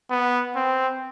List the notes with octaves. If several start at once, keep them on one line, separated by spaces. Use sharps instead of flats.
B3
C4